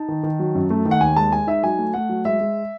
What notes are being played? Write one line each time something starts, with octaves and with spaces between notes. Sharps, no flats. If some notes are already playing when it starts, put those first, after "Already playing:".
Already playing: D#4 A5
D#3
D#3
F#3
F#2
A3
D#3
F#5
D#2 G#5
G#3 A5
G#3 G#5
D#4 E5
F#3 G#5
A3
A3 F#5
F#3
G#3 E5
G#3